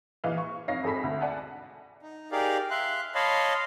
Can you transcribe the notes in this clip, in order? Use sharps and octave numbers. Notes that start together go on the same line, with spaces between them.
A#1 E3 D#5 F5
C#6
F2 D#4 C#5 F5 A#6 C7
G#1 G#4 A4 B5 B6
D2
D5 F#5 G#5 A5
D#4
D#4 G4 G#4 A#4 D5 F5
E5 F5 C6 F#6
C#5 D#5 F5 A5 B5 C6